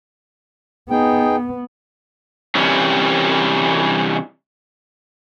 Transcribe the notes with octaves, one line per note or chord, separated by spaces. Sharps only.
B3 D#4 G#4 G5
C3 E3 G3 C#4